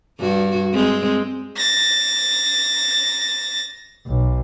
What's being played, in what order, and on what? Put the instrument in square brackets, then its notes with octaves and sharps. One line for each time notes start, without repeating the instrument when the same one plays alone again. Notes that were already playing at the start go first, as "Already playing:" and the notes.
[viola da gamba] G2 F#4
G#3 C4
[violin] A6 A#6
[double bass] B1